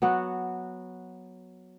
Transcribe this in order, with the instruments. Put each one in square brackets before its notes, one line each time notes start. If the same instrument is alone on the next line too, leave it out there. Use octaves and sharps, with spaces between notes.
[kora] F#3 B3 F#4